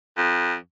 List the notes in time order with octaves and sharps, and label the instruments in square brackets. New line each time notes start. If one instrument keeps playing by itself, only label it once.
[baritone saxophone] F2